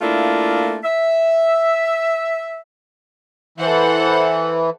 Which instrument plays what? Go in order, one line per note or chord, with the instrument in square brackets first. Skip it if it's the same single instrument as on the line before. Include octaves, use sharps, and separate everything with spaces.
[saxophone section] A3 A#3 D4 E4 F4
E5
[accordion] E3 [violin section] A4 C5 F#5